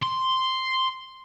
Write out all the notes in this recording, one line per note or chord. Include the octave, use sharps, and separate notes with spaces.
C6